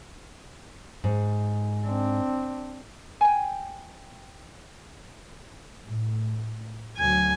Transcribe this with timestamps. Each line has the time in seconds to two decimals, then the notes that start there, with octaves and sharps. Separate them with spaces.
1.04 G#2
1.86 C4 D4
3.21 G5 G#5
5.86 A2
6.97 D2 F#3 G#5